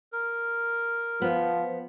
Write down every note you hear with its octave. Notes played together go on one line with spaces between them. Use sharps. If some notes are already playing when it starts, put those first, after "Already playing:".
A#4
F3 B3